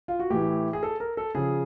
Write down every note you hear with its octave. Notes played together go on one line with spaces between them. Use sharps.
F4
F#4
A2 E3 G4
G#4
A4
A#4
A4
C#3 F3 G#4